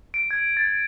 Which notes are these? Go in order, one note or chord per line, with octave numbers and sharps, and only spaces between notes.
D7
G#6
A6